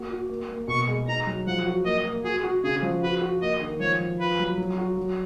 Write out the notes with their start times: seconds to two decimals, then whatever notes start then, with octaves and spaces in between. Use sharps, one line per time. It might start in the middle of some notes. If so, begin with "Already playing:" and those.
Already playing: A#3 F#4
0.10 F#4
0.29 A#3
0.49 A#3
0.68 B2 C#6
0.88 G#3
1.08 D#4 A#5
1.26 F#3
1.47 F3 F#5
1.66 F#4
1.85 A#3 D#5
2.05 A#3
2.24 F#4 G#4
2.44 F#4
2.63 C#3 G#4
2.82 F3
3.02 F#4 B4
3.21 F#4
3.41 A#3 D#5
3.60 D#3
3.80 F3 C#5
4.00 F3
4.19 F4 B4
4.39 F#3
4.58 F#3
4.78 F#4
4.97 F#3